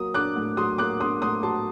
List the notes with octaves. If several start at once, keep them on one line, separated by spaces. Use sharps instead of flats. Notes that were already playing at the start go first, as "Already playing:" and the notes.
Already playing: F#3 A#3 D#6
D4 D6 F#6
A2
F#3 C6 D#6
A#3 D6 F#6
D4 C6 D#6
A2 C6 D#6
F#3 A5 C6